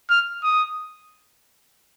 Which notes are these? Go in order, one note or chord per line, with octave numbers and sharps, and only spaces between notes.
F6
D#6